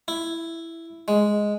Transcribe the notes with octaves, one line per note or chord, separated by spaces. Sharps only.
E4
G#3